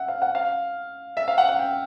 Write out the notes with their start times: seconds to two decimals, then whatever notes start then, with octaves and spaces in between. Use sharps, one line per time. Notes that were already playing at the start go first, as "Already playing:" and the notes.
Already playing: E5 F#5
0.08 F5
0.22 F#5
0.35 F5
1.17 E5
1.28 F5
1.38 F#5
1.49 F#5
1.59 G5